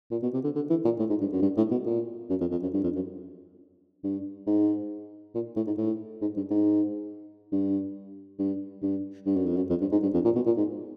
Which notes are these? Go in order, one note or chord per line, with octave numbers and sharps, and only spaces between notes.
A#2
B2
C3
D3
D3
E3
A#2
A2
G#2
G2
F#2
G2
A2
B2
A#2
F#2
F2
F2
F#2
G2
F2
F#2
G2
G#2
A#2
A2
G#2
A2
G#2
G2
G#2
G2
G2
G2
G2
F#2
F2
F#2
F2
G2
G#2
G2
F2
A#2
B2
A#2
G#2